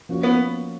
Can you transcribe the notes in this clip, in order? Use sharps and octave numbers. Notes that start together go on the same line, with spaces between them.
F3 A#3 C#4 F#4
B3